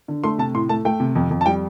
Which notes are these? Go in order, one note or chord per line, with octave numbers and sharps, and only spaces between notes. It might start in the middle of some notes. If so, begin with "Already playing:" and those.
D3
A3 C6
C3 A5
A2 C6
A3 A5
A3 G5
C3
F2
F2
A5
G3 G5